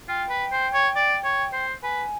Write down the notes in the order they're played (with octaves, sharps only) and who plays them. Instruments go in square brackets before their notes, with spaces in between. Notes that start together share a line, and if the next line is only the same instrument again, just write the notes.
[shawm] F4 [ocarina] G5
[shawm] B4
C5
C#5
D5
C#5
C5
[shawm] B4 [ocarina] G#5